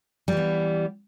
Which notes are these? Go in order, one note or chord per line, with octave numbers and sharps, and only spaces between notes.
E3 G3 B3